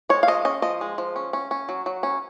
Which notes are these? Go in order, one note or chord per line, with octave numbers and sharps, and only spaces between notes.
G#3 C#5
F5
F3 D#5
C#4 D#5
F3 D#5
G#3
F3
C#4
C#4
C#4
F#3
F#3
C#4